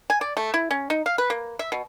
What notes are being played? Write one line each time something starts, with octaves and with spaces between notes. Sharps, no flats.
G#5
D5
A3
E4
C#4
D#4
F5
B4
A#3
E5
B2